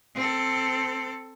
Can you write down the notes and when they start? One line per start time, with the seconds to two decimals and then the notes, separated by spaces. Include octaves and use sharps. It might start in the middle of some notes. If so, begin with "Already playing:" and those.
0.15 C4 A4